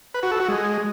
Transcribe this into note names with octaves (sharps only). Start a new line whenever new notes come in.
B4
F#4
A4
F#4
G#3